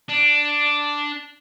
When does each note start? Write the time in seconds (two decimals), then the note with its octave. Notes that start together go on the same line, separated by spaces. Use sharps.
0.08 D4